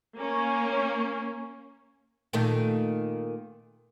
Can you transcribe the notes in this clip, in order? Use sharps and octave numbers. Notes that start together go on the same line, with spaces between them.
A#3 C#4
A#2 D#3 A3